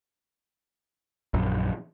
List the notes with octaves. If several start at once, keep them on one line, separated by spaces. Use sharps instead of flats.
A#1 F#2